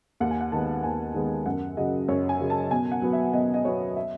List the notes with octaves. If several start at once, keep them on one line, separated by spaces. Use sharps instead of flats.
D#2 F#5
G#5
F#5
D#3 G#3 B3 A5
D#2 G#5
D#3 G#3 B3
F#2 F#5
C#3 F#3 D#5
F#2 C#5
G#5
C#3 F#3
A5
B2 G#5
F#5
F#3 B3
E5
B2 D#5
D#5
F#3 B3 C#5
E5